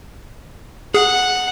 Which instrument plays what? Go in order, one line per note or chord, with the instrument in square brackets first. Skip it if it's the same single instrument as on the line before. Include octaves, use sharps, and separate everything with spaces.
[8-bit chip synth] G#4 [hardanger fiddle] F#5